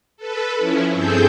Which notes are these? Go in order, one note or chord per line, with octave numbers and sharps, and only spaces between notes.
A4 B4
F3 C#4 E4
G2 C4 G#4 A4 G6